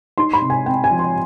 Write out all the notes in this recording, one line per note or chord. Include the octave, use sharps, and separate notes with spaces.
D#4 C6
B5
C3
G#5
C4 G5
G#5
F3
C6